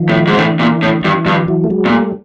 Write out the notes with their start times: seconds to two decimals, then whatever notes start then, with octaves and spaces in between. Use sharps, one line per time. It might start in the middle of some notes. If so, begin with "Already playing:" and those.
Already playing: D#3 F3
0.09 A2
0.27 G#2
0.37 A2 D3 E3
0.59 A#2
0.82 A2
0.88 D3
1.01 G2 D#3
1.13 E3
1.26 G2 D#3 F3
1.48 E3 F#3
1.64 A3
1.70 F#3 G#3
1.85 A#2
1.92 G3 A3